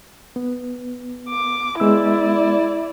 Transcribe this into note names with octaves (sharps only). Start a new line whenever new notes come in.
B3
D6
G#3 B3 E4 D5 E6